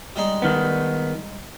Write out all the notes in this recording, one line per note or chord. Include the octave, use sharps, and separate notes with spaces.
G3 G#3 D#4
D#3 B3